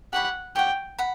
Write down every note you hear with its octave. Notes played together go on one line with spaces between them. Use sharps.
G4 C#5 F#5 G5 B5
G4 C#5 F#5 G5
F#5 B5